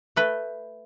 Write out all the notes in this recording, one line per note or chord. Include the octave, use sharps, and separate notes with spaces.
A3 B4 G5